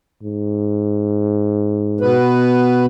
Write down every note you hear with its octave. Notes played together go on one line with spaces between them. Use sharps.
G#2
B2 B3 B4